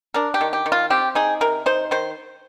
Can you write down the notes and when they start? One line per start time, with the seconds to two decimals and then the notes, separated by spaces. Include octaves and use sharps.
0.14 D4 A#4
0.34 G4
0.41 D#3
0.53 G4
0.66 D#3
0.72 F4
0.90 C4 G4
1.15 D#4 G#4
1.41 C3 A#4
1.66 D#4 C5
1.91 D#3 C5